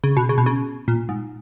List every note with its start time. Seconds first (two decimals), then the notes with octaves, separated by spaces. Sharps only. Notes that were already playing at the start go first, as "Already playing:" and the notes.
0.04 C#3
0.17 B2
0.29 C#3
0.38 B2
0.46 C#3
0.88 A#2
1.09 G#2